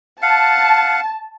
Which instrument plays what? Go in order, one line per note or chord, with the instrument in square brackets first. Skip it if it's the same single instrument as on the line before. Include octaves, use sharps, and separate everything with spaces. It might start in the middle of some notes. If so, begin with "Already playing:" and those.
[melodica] F5 F#5 [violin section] A5